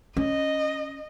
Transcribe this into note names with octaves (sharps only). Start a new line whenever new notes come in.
C#4 D#5